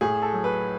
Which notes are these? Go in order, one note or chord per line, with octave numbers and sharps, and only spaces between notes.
A2 G#4
A4
F#3
B4